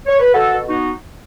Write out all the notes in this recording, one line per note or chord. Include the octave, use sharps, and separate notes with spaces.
C#5
B4
B2 F#4 A4
B2
B3 D#4 F#4